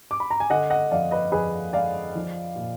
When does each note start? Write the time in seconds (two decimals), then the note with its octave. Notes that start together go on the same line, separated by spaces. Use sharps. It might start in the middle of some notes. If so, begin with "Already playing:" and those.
0.11 D6
0.20 B5
0.31 A#5
0.40 G#5
0.50 D3 D#5 F#5
0.70 D#5 F#5
0.91 F2 D5 F5
1.11 B4 D#5
1.32 F2 G#4 B4
1.73 G#3 D5 F5
2.15 F3
2.56 A#2